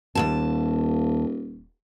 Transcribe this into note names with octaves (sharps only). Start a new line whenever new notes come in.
D#1 D#2 G#2 A5